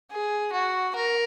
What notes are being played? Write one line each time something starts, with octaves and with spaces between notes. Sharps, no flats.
G#4
F#4
A#4